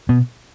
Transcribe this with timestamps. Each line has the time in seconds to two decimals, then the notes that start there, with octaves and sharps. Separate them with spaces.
0.09 B2 B3